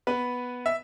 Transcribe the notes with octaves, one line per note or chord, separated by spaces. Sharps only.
B3 B4
E5